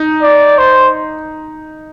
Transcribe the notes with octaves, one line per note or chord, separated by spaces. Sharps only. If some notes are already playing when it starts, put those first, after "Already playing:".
Already playing: D#4
D5
C5